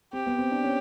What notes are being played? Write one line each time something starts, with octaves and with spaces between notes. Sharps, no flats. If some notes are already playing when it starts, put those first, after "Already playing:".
C4 G4
B3
C4
D4
C#4